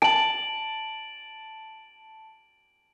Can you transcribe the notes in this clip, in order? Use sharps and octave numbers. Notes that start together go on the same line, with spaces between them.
A5 D7 F#7